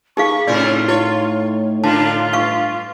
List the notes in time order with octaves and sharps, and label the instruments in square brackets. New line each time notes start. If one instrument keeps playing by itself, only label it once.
[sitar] A#3 [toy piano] D#4 G#4 F5 [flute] C#6
[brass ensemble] A2 D#4 [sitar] C3 C#4 A#4 [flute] F4 [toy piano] D5
[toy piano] E4 [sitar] C#5
[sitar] D3 A#3 D4 [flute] F4 [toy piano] A5
[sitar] G2 [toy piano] F5 C#6 D6